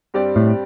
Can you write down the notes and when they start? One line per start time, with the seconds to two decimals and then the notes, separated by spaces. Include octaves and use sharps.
0.14 G2 G3 C4 G4 D5
0.36 A2